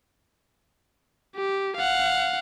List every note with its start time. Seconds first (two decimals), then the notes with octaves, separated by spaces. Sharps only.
1.36 G4
1.76 F5 F#5